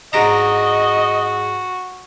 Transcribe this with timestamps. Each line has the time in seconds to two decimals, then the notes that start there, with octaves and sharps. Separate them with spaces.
0.13 G#2 D4 F#4 D#5 A#5